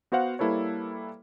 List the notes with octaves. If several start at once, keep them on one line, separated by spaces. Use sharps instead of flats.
B3 F#4 C5 F5 F#5
G3 A#3 E4 A4 B4 C#5